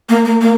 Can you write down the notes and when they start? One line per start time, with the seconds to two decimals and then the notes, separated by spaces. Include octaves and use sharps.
0.09 A#3
0.25 A#3
0.41 A#3